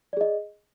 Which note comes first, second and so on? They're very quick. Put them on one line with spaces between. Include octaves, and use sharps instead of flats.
D5 G#4 D#5